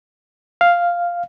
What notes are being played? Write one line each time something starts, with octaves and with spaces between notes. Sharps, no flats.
F5